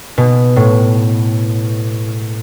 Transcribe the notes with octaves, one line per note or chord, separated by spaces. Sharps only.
B2
A2